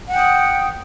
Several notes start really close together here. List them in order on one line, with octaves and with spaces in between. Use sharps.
F#5 G5 D#6